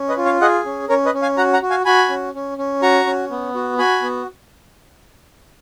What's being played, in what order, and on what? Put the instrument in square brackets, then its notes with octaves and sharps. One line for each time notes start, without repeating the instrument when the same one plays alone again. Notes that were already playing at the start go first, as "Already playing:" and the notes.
Already playing: [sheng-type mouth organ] C#4
B4 D#5
F4
C#5 F5
G#4 D#5 F#5
C#4
C#4 A#4 C#5
B4 D#5
C#4
F5 G#5
F#4 F#5 A#5
F#5 A#5
F#4
F5 G#5
F#4 G#5 B5
C#4
C#4
C#4
F#4 A#5 C#6
C#4
B3
F#4
F#4 G#5 B5
B3